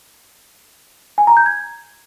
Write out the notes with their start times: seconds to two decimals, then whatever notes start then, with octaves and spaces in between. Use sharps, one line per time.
1.18 G#5
1.27 A#5
1.37 G6
1.46 G#6